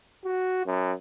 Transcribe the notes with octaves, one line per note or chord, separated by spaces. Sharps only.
F#4
F#2